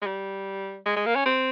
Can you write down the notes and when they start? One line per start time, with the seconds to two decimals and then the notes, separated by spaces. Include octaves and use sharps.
0.02 G#3
0.06 G3
0.86 G#3
0.96 G#3
1.06 A#3
1.16 C#4
1.26 C4